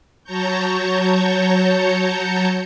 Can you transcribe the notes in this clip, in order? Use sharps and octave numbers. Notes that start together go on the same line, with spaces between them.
F#3 C#5 A5 A#5 C#6 G6